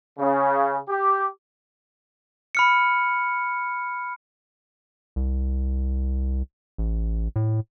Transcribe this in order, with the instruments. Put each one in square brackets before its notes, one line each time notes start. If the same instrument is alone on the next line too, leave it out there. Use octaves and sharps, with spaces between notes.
[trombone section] C#3
G4
[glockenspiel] B5 F6 C#7
[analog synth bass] C2
A1
A2